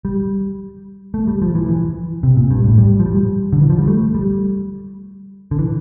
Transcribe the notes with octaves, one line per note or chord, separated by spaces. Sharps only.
G3
A3
G3
F3
E3
E3
C3
A#2
G2
A2
G3
F3
G3
D3
E3
F3
G3
A3
G3
D3
E3